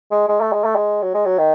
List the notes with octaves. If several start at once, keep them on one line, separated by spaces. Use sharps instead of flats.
G#3
G#3
A3
G#3
A3
G#3
F#3
G#3
F#3
D#3